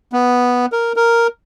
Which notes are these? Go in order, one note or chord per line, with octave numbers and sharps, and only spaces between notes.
B3
A#4
A#4